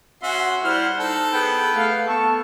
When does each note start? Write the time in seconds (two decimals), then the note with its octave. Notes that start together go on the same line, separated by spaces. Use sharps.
0.23 C#4 F#4 E5 C6
0.64 G3 E4 C5 F#5 F6
0.99 D#4 A4
1.33 B3 G#4 F#5 G5
1.73 A3 F5
2.07 B3 A4 C#6